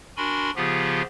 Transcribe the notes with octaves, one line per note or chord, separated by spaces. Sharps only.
D4 F#4 A#4 G#5 B5 C6
C#3 F3 B3 F4 G4 G#4